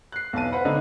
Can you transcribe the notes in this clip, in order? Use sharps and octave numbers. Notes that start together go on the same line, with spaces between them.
F#6 C7
B1 E2 A5 D#7
B4 C5 F#5 B5
B1 D3 D#4